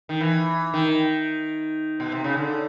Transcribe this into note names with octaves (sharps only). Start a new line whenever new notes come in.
D#3
E3
D#3
B2
C3
C#3
D3